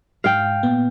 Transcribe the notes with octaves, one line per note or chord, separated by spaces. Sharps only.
G#2 F5 G5
A#2 B3